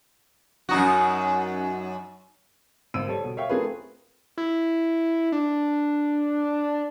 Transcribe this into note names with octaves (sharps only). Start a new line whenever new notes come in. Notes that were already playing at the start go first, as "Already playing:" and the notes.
F#2 D#4 F#4
G#1 E6 D7 D#7
G3 A4 C#5
B2
C#5 E5 F5 G5 C#6
A3 C4 F4 G#4 A#4 B4
E4
D4